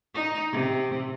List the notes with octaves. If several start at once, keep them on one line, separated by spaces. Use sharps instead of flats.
D#4
C3